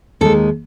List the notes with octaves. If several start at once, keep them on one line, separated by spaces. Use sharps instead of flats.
D#2 D#3 G#3 A4